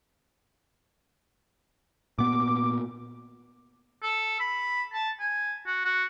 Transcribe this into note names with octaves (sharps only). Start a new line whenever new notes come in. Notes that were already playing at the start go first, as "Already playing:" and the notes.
A#2 B3 D6
A4
B5
A5
G#5
F#4
F#4